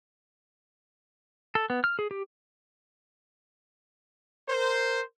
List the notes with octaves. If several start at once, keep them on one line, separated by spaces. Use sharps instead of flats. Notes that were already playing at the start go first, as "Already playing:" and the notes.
A4
B3
F6
G#4
G4
A#4 C5